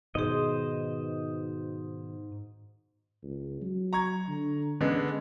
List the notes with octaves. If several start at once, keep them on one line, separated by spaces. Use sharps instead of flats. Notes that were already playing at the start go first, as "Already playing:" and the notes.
G#2 B2 D#3 D#4 G#4 C5 D#5
C#2
F#3
A#5 C#6 G#6
D3
D3 G#3 B3 C#4